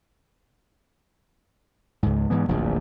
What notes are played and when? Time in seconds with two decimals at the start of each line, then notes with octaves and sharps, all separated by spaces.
2.03 C#2 G#2
2.30 G#2 E3 B3
2.48 D1 A#1 E2